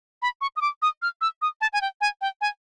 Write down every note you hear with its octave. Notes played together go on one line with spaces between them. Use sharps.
B5
C#6
D#6
D6
D#6
F6
E6
D#6
A5
G#5
G5
G#5
G5
G#5